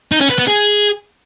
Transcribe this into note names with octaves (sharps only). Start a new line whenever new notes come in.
D#4
C#4
B4
B3
G#4